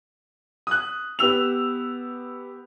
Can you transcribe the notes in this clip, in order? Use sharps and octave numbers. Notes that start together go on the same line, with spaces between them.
D#6 F#6
B3 G4 E6 F7